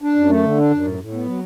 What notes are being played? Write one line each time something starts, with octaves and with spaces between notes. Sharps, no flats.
D4
F#2
A3
D3
D4
F#2
A2
A2
B3
F#3